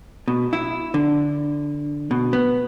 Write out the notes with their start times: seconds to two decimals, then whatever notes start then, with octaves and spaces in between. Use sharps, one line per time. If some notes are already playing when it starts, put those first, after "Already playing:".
0.28 B2
0.53 E4
0.94 D3
2.11 B2
2.33 B3